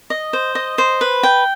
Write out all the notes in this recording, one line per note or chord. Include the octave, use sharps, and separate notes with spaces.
D#5
C5
D#5
C5
B4
G5